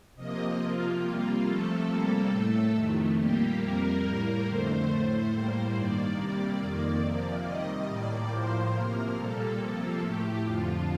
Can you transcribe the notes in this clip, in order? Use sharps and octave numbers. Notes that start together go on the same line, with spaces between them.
C3 F3 A#3 D#5
C3 F3 A#3 F4
C3 G3 A#3
C3 F3 A3 A4
C3 G3 A#3
A2 A3 A4
F2 C3 D#3 A3
A#2 G3 A#3 G4
F2 C3 G3 A#3 A#4
A2 G3 A#3 A#4
F2 D3 A3 C5
A2 A3 C5
A2 G3 A#3
G2 D#3 A#3 D5
C3 G3 A#3
F2 D#3 A#3
C3 F3 A#3
C3 D#3 G3 D#5
A2 G3 A#3 D5
A2 F3 A#3 C5
C3 F3 A#3 A#4
A#2 G3 A#3 A4
C3 F3 A#3
A2 A3 G4
F2 D3 F3 F4